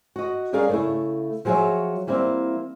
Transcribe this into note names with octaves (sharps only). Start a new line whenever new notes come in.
F#4 D#5
G3 C#4 G#4 A#4 D5 F5
C#3 A3 E4
F3 F#3 G#4 A#4 C#5 E5
E3 G3 A#3 C4 E4